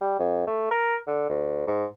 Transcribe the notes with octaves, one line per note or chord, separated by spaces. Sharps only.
G3
F2
A3
A#4
D3
D2
G#2